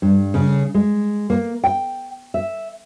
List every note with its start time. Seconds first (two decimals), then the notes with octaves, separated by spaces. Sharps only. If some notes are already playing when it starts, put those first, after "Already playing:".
0.02 G2
0.34 C#3
0.74 G#3
1.30 A#3
1.64 G5
2.34 E5